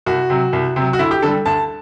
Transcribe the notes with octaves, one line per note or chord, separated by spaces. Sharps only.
C2 F#4
C3 F#3
C2
C3 F#3
F#4
D2 E4
G4
D3 G3 A4
D2 A5